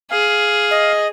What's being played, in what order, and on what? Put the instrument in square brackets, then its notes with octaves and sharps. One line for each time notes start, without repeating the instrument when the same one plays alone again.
[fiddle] G#4 [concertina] F5
[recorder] D#5